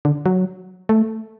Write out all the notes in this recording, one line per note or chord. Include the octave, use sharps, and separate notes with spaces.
D3
F#3
A3